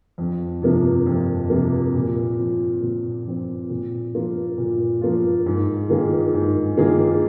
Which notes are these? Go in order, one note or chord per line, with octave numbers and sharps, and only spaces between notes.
F2
C3 F3 A#3
F2
C3 F3 A#3
A#2
F3 C4
A#2
F3 C4
A#2
F3 A#3 F4
A#2
F3 A#3 F4
G#2
D#3 A#3 F4 G#4
G#2
D#3 A#3 F4 G#4